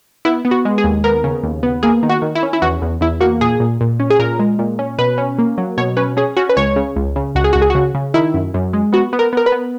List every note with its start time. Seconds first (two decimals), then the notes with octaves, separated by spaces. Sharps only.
0.25 B3 E4
0.45 B3
0.51 F#4
0.65 G#3
0.78 G#4
0.84 D#2
1.04 B3 A#4
1.24 C#3
1.43 D#2
1.63 B3
1.83 A#3 G#4
2.03 D#3
2.09 F#4
2.22 D#3
2.35 E4
2.43 C#4
2.53 E4
2.62 E2 F#4
2.82 E2
3.01 E2 E4
3.20 A#3 F#4
3.41 A#2 G#4
3.60 A#2
3.81 A#2
4.00 C#4
4.10 G#4
4.19 A#2 A#4
4.39 G#3
4.59 A#2
4.79 C#4
4.98 B2 B4
5.18 C#4
5.38 A#3
5.58 F#3
5.77 B2 C#5
5.97 C#4 B4
6.17 C#4 G#4
6.37 C#4 F#4
6.49 B4
6.57 C#2 C#5
6.76 C#3
6.96 C#2
7.16 C#3
7.35 C#2 F#4
7.44 G#4
7.53 C#2 F#4
7.62 G#4
7.70 C#3 F#4
7.95 C#3
8.14 D#3 E4
8.34 F#2
8.54 F#2
8.73 G#3
8.93 B3 F#4
9.13 B3
9.19 A#4
9.33 B3 A#4
9.46 B4
9.52 B3